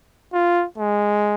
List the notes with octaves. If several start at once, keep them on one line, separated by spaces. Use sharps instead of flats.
F4
G#3